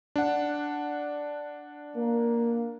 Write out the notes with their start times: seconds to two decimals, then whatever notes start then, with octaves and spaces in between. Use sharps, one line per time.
0.16 D4 F#5
1.97 A#3